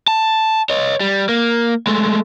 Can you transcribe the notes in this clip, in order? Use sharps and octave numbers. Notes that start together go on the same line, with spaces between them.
A5
C#5 D#5
G3
A#3
G#3 A3